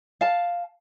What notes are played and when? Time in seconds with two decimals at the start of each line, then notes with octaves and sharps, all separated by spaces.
0.21 F5 A5